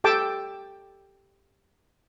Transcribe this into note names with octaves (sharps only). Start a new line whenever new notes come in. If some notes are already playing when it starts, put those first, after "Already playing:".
G4 A4 G5 A5 D6